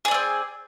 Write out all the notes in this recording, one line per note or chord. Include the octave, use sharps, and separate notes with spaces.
A3 C4 G#4 D5